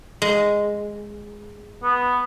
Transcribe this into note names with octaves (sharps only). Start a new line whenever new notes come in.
G#3
B3